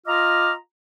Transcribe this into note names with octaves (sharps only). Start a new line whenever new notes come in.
F4 D#5 A#5 D6 F6